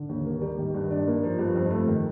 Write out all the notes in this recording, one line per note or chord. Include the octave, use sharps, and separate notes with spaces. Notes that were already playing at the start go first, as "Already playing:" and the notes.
Already playing: D3
D#2
A#3
G3
D#3
G2
D4
A#3
F3
G2
F2
A3
D#3